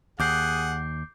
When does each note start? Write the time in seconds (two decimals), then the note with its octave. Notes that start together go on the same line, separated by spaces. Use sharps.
0.20 D#2 G#4 F#5 D6 G6 C7